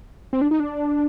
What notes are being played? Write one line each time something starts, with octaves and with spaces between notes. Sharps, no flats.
C4
D4
D#4
D4